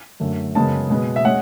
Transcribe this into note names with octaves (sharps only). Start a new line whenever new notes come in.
F#2 D3 A3
F#2 C#3 G#3 B3 A5
B2 G#3 B3
E5
G#3 C#4 F#5